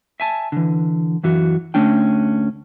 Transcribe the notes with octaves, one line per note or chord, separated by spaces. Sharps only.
E5 G#5 A5
D3 E3
F#2 E3 F#4
D2 A3 C#4 D4 G5